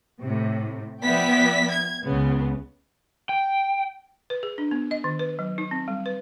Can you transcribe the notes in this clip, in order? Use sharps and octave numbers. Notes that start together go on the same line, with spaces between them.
A2 C3
F3 B3 D5 E5 G5 B6
G#6
C#2 C#3 B3
G5
B4
G#4
D4
B3
D#5
D#3
B4
F#3
D#4
C4
G3
B4